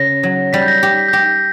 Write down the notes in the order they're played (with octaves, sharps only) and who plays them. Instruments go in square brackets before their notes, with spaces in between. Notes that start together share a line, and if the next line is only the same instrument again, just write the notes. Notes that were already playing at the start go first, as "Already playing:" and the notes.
Already playing: [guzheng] C#3 [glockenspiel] A#6
[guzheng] F#3
[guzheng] G3 [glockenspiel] B6
[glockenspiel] G6
A#6
[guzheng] G4 [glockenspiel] A#6
[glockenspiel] B6
G6
[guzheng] G4 [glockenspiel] A#6